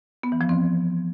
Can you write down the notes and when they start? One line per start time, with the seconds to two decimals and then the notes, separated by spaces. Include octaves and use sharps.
0.23 B3
0.32 E3
0.41 F3
0.49 C4